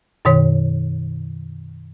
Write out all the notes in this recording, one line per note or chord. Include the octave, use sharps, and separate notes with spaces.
F#2 B2 D#3 C#5